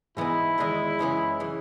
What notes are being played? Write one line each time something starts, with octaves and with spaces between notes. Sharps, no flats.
G#2 E3 B3 D#4 E4
E2 D#3 G#3 D#4
F#2 C#3 E3 G#3 C#4
C#3 E3